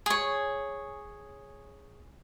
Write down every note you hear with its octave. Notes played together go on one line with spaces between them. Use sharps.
G#4 C#5